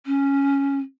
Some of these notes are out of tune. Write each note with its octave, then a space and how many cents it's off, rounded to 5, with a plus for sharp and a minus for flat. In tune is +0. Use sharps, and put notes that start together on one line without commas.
C#4 +0